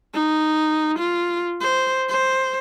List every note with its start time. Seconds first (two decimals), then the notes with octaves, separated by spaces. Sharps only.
0.14 D#4
0.99 F4
1.61 C5
2.09 C5